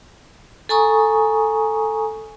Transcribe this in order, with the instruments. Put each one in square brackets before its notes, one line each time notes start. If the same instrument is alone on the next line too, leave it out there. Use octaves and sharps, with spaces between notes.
[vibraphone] A4 G#5 A#5 C#6 D#6